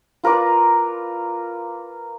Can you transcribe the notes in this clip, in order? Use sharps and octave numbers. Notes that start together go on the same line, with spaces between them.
F4 A#4 B4 D5